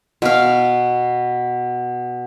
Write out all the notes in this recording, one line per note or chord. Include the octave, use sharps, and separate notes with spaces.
B2 F5